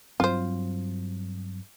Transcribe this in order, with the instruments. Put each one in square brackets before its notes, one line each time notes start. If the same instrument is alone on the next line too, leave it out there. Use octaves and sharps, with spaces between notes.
[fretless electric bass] G2 F#3 C4 [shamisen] F4 C5